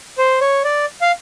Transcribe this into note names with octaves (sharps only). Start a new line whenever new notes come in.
C5
C#5
D5
F5